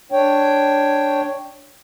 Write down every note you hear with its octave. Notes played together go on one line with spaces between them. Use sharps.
D4 C#5 G5